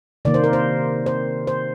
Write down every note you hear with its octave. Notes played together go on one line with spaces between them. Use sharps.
C3 D#3 A#3 D5
C5
A#4
C5
C5
C5